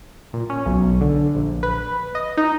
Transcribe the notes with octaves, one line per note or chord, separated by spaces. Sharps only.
A#2
C#4
B1
D3
A#1
B4
D#5
D#4